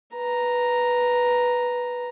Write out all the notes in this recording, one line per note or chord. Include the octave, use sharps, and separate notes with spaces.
B4 A#5